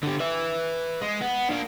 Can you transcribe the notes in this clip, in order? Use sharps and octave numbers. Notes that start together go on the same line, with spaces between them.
D3 G4
B4 E5
G#3
B3
A#3 D4